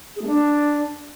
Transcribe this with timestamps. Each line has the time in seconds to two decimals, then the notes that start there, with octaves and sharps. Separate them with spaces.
0.16 G#4
0.22 A3
0.27 D4